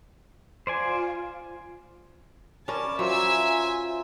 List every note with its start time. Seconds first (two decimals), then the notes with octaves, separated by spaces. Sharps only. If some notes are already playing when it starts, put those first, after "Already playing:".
0.67 F4 C5 D5 G#5
2.68 C#4 A#4 B4 D5 A5
2.99 F#3 F4 A#4 C5 E5 G#5 E6